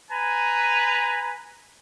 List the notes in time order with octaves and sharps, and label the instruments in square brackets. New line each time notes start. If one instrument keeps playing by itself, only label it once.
[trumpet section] B4 G#5 A#5